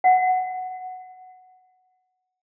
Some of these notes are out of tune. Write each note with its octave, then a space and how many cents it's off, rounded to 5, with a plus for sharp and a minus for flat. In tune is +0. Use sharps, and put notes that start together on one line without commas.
F#5 +0